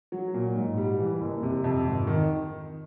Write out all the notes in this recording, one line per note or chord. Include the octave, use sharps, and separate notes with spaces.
F#3
A#2
G#2
G3
E3
F#1
C3
F2
G#1
D#3